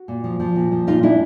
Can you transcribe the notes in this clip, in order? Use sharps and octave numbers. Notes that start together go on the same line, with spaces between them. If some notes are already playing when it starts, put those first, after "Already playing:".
Already playing: F#4
A#2
F3
F3
A#2
F3
A#2 D#4 F4
F3 D4 E4